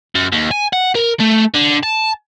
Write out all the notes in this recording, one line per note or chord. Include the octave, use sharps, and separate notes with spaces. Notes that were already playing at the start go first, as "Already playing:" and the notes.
F#2
D#2
G#5
F#5
A#4
A3
D3
A5